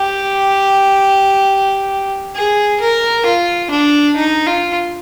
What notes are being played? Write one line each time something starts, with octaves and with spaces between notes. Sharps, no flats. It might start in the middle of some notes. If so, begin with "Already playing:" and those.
Already playing: G4
G#4
A#4
F4
D4
D#4
F4